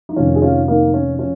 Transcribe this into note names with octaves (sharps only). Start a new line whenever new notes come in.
D#4
F1 F2 D#3 C#4 F4
G#4
C#4 F4
A#3 D#4
C#4
F3 C#4